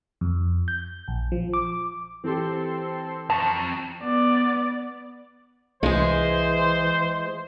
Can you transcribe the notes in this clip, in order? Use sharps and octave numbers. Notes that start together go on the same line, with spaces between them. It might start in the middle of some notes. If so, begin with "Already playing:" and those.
F2
G6
A#1
F3
D6
E3 C4 G4 A4 C6
F2 A5 A#5 C#6
B3 D5
C2 E3 G#3 E4 G#4 C5